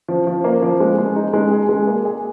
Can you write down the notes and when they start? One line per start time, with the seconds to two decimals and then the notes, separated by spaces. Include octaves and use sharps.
0.08 F3
0.27 F3
0.44 A#3
0.62 F3
0.80 G#3
0.98 G#3
1.16 D#4
1.33 G#3
1.51 G#4
1.69 G#3
1.87 A#3
2.05 G#4